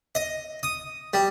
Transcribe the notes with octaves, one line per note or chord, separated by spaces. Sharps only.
D#5
D#6
G3